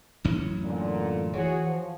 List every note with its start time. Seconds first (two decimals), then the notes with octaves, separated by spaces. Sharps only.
0.24 A1 F#2 C#4
0.64 A#2 D3
1.33 E3 F#4 G#4 C#5
1.64 F3